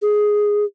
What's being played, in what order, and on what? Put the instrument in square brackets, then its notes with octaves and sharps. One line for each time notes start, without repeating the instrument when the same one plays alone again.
[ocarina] G#4